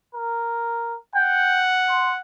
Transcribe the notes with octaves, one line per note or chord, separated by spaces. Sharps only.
A#4
F#5 G5
C6